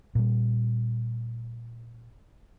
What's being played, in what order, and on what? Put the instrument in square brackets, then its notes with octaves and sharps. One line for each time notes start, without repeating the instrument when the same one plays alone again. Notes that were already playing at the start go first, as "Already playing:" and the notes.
[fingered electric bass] A#2 G3